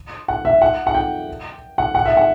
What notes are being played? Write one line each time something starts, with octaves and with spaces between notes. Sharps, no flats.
F#5
E5
F#5
F#5
G5
F#5
F#5
E5
F#5